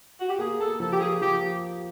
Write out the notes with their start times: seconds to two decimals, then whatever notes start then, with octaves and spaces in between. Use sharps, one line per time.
0.20 F#4
0.29 G4
0.39 A#3 G#4
0.59 A#3 A4
0.80 F3 A4
0.92 G4
1.00 F3 G#4
1.21 F3 G4